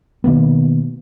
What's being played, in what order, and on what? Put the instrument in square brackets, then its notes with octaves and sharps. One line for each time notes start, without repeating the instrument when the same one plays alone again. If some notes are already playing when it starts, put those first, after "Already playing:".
[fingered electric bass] B2 D#3 A#3 B3